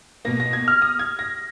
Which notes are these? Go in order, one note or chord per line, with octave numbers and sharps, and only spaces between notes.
B2 A#3 A#6
A#6
G#6
F6
D#6
G#6
A#6